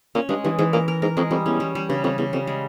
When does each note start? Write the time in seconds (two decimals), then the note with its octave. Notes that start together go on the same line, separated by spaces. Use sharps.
0.15 A#2 C#4
0.29 G2 G#3
0.44 G2 E3
0.58 G#2 E3
0.73 A#2 A#4
0.88 A#4
1.02 G#2 A#4
1.17 F2 G#3
1.31 F2 G3
1.46 E2 C#4
1.60 G3
1.75 G3
1.89 G2 C#3
2.04 F2 G3
2.18 E2 C#3
2.33 F2 G3
2.47 G#3